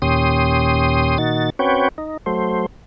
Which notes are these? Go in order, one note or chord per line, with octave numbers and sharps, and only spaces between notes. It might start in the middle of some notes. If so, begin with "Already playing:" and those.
D#2 A#2 C#4 G4 C6 D#6
A#2 D#3 D#4 F#4 A6
C4 C#4 F#4 B4 C#5 G5
D#4
F#3 A3 C5